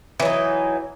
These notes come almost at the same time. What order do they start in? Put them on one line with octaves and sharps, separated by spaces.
E3 F#3 D#4